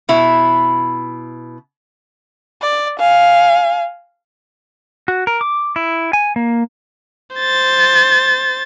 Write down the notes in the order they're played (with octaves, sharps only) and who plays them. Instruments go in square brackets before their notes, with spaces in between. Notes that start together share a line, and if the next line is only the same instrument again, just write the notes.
[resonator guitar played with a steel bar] B2 E4
[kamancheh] D5
F5 G#5
[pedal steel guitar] F#4
A#4
D6
E4
G#5
A#3
[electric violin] C5 A6